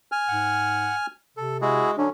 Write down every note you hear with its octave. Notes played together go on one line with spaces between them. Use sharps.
G#5 F6
G#2 F#5
C3 A4
G#3 E4 F#4 G#4
D3 F#3 C#4 D4